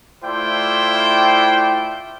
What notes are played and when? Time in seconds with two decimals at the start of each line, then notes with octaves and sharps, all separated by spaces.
0.24 A3 E4 F4 C5 D5 G5